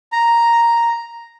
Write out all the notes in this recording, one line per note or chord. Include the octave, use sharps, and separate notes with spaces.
A#5